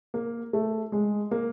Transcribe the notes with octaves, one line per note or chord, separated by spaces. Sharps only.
A#3
A3
G#3
A#3